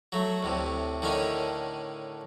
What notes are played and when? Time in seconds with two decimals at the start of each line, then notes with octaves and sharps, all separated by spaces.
0.12 F#3 A3
0.42 D2 A2 C3
1.02 A2 D3 D#3 C#4 G#5